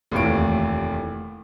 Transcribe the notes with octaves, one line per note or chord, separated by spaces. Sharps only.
F1 D#2 A2 E3 D7